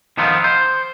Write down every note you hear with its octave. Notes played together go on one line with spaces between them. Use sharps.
D#3 F3 B3 C4 D#4 F4
C5